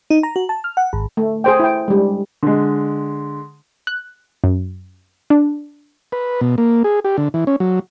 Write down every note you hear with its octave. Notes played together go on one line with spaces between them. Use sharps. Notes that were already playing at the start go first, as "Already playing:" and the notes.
D#4
A#5
F#4
A5
F6
F#5
G#1
A3
G#4 C5 G5
E4 G5
G3 G#3
D3 G#3
F#6
F#2
D4
B4
B2
A#3
G#4
G4
D3
E3
C#4
F#3